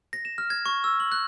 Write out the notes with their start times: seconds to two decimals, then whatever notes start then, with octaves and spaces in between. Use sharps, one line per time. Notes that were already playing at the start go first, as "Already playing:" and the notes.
0.13 A#6
0.25 E7
0.38 F6
0.50 G#6
0.66 C#6
0.84 E6
1.00 F#7
1.12 F#6